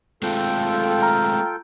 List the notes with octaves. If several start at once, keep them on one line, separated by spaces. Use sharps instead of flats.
G#3 A3 C4 F4 A4 G5
A#5 F6